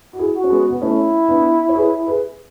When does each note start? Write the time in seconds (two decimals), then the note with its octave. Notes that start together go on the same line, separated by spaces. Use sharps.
0.13 F#4
0.19 E4 G#4
0.35 F#4
0.44 C#4
0.50 G#3 B3
0.70 B3
0.81 A3 C#4 E4
1.29 B3 D4
1.69 C#5
1.75 G#4 B4
2.07 G#4 B4